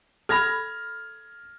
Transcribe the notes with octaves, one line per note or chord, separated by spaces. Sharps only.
A4 B5 F6 G#6 A#6